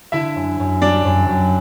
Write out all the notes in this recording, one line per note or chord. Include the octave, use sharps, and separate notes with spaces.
D3 E4 E5
F#2
F#2
G3 D4 D5
F#2
F#2